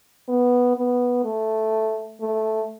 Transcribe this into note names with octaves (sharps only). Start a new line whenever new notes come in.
B3
B3
A3
A3